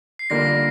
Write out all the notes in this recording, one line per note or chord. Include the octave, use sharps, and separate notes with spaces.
C7
D3 G3 A#3 F4 A#6